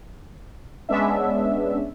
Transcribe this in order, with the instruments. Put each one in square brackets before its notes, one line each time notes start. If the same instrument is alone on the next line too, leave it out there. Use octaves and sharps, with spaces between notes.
[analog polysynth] G#3 B3 C#4 D4 E5